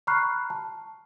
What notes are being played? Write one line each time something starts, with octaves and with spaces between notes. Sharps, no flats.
A#5 B5 C#6 F6 F#6 C7
A5